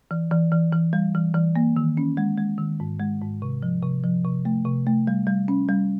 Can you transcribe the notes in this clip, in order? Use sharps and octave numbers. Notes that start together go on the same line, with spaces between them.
E3
E3
E3
E3
G3
E3
E3
A#3
D#3
C#4
G#3
G#3
D#3
G#2
G#3
G#2
C3
F3
C3
F3
C3
A3
C3
A3
G3
G3
C#4
G3